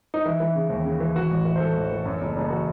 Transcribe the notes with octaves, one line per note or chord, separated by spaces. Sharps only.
D#4
E3 E4
E3
C#3
D#2
C#3
E3
E3 F#4
A1
E3
C5
A1 A4
A1
E3
F#2
F#1
F#1
E3 F#4